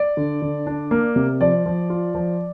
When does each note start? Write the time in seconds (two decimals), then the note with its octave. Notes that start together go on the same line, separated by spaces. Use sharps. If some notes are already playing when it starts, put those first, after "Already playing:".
Already playing: D5
0.17 D3
0.42 D3
0.67 D4
0.91 A#3
1.16 C3
1.41 F3 D5
1.66 F3
1.90 F4
2.15 F3